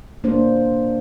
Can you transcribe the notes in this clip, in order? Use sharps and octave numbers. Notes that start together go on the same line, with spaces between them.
A#3 D4 C5